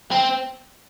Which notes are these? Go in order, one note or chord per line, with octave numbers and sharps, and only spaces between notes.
C4